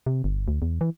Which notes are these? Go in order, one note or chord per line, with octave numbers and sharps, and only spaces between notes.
C3
G1
D2
E2
E3